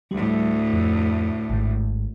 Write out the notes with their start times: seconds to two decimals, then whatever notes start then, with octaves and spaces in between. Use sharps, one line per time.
0.11 D2 A2 G3
0.73 F2
1.50 G#1 G#2